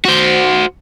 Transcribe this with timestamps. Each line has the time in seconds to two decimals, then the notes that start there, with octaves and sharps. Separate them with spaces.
0.05 F#4 C5